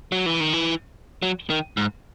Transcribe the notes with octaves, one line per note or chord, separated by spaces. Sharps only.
F#3
E3
D#3
E3
F#3
D#3
G#2